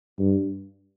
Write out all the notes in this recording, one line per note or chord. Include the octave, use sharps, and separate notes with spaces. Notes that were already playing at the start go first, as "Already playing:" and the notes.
G2